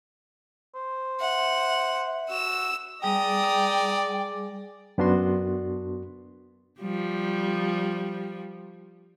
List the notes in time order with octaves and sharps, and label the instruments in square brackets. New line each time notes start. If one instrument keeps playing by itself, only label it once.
[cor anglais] C5
[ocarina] E5 [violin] F#5
[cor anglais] F#4 [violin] E6 E7
[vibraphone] G3 G#4 G#5 [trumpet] D5 [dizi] G5 [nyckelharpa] A#5 D#6
[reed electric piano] F#2 B3 D4 F#4 C6
[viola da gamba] F3 G3